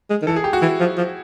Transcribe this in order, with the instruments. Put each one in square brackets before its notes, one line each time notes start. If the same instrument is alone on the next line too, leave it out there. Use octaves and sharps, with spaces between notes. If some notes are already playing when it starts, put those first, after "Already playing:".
[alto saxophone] G#3
D#3
[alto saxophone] E3 [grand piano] A4
[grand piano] G#4
G4
F#4
[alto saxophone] E3 [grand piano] E4
[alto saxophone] F3
F3